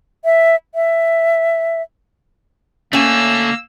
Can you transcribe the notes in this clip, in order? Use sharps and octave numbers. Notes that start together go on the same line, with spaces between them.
E5
E5
D3 A3 A#3 C#4 G#5 E6